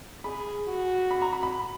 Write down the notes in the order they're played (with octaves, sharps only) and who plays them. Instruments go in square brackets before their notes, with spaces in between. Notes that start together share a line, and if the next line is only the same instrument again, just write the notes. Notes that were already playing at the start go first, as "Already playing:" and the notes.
[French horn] G#4 [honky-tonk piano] B5
[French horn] F#4
[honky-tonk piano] B5
A#5
B5
B5